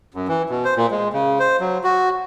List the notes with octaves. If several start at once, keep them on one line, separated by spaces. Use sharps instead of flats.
F#2
E3
B2
C5
A#2
G#3
C#3
C5
F#3
F#4